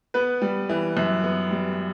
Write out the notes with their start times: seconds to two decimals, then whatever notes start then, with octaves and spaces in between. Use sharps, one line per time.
0.14 B3 B4
0.42 G3
0.69 E3
0.97 F#2
1.24 B3
1.51 G3